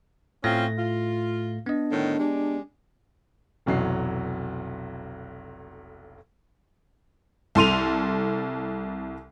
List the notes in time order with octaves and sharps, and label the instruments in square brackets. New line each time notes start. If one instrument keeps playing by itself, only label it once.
[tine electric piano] A2 A3 A#6 [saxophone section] C4 C#4 F4
[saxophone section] F4
[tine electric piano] B3 D#5 [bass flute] D4
[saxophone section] A2 D3 D#3
G#3 G4 D5
[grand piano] F1 B1 E3 F#3 D#5 C7
[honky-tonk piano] C2 A4 C6 D#7 F7